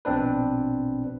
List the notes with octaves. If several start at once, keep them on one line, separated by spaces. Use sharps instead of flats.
A#1 B2 C4 D4 B4